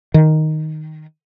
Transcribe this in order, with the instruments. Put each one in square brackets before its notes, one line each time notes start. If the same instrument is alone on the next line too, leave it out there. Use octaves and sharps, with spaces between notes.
[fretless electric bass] D#3